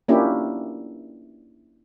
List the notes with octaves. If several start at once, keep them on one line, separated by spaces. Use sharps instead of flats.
A#3 C#4 D4 E4 F4 G4